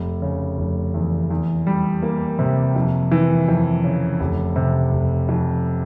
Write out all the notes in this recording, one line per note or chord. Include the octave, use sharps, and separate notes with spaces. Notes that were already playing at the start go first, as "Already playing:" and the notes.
Already playing: F1
C#3
F1
E2
E2
G3
A#3
C3
F2
E3
F2
C#3
F1
C3
F1
F2